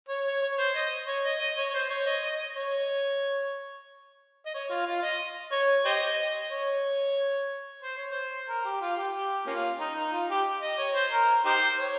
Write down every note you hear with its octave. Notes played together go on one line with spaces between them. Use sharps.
C#5
C#5
C#5
C5
D#5
C#5
D#5
D#5
C#5
C#5
C5
C#5
D#5
D#5
C#5
D#5
C#5
F4
F4
D#5
C#5
G4 C5 D#5
C#5
C5
C#5
C5
A#4
G4
F4
G4
G4
A#3 C#4 F4
D#4
D#4
F4
G4
D#5
C#5
C5
A#4
D#4 G4 C5
C#5